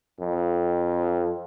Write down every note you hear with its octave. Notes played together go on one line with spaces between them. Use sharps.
F2